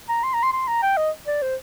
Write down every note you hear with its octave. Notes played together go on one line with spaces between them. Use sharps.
A#5
C6
A#5
C6
C6
A#5
G5
D#5
D5
C5